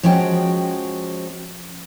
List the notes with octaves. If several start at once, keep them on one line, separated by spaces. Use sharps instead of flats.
F3 G#3 C#4 F#4 G5